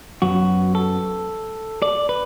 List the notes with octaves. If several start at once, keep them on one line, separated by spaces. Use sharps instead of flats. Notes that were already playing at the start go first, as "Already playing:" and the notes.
F#2 F#3 B3 F#4
A4
D5
B4